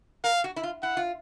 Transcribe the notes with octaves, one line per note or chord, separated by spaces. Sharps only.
A#4 F5
F#4
E4
F4
E4 F#5
F4